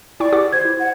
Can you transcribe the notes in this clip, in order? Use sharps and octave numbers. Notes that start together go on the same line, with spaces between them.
E4 D5 G5 C#6
G4 F#5 D6
C5 G#6
E4
F#5